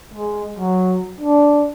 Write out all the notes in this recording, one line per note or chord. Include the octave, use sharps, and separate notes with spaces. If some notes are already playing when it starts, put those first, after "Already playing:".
G#3
F#3
D4